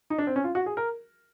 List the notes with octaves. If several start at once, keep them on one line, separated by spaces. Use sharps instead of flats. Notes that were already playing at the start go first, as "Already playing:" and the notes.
D#4
D4
C4
C#4
F4
F#4
G#4
A#4